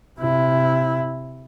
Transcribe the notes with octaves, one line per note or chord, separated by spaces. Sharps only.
C3 E4